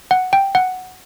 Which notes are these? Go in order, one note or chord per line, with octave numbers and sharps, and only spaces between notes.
F#5
G5
F#5